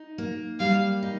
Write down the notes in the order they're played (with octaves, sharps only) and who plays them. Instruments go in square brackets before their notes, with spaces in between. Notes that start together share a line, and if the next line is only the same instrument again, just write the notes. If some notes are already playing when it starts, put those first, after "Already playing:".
Already playing: [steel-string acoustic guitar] D#4
A#3
[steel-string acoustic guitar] G3 [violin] F5
[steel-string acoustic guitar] D#4